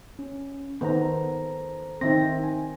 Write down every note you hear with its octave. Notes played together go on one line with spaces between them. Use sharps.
C#4
D#3 B3 A4 C5 A#5
D#3 C4 D#4 E5 A#6
D#4 G#5